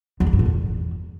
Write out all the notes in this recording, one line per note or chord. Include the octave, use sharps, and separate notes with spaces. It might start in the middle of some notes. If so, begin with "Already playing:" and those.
E2
F3
G2
A2
E2